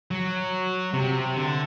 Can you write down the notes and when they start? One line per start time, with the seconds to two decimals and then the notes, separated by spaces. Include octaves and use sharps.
0.11 F#3
0.94 C3
1.36 D3